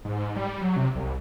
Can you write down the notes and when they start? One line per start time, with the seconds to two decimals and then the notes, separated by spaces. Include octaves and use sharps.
0.05 G#2
0.36 G3
0.61 F#3
0.76 C3
0.95 C2